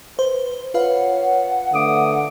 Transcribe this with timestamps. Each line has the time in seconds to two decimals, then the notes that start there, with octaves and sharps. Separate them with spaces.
0.19 B4 C5
0.74 F4 B4 C#5 F5 F#5
1.72 D3 A3 D6 D#6